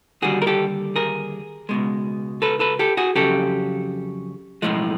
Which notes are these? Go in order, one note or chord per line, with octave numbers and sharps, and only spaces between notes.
D#2 D3 G3 F#4 G#4
A#4
G4 A4
G#4 A#4
C#2 B2 G#3
A4 B4
A4 B4
G4 A4
F#4 G#4
F2 C#3 F#3 G4 A4
B1 A2 F3 G#3